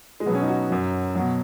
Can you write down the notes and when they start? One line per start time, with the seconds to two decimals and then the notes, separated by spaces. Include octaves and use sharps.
0.20 G#3
0.26 B2 F#3 B3
0.34 C#4
0.41 D#4
0.48 F#4
0.70 F#2 F#3
1.15 B2 F#3